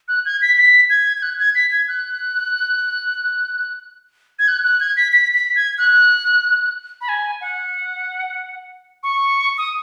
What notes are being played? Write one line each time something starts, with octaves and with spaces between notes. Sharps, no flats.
F#6
G#6
B6
B6
G#6
G#6
F#6
G#6
B6
G#6
F#6
G#6
F#6
F#6
G#6
B6
B6
B6
G#6
F#6
B5
G#5
F#5
C#6
D#6